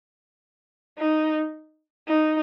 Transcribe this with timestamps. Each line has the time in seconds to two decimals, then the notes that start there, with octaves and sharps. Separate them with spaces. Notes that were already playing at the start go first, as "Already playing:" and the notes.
0.98 D#4
2.08 D#4